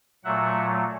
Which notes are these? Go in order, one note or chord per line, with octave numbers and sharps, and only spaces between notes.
A#2 F#3 A3 E5 F#5